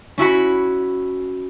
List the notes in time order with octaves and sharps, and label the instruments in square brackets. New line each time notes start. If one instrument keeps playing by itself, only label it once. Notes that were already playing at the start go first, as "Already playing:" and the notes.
[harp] C#4 E4 F#4 B5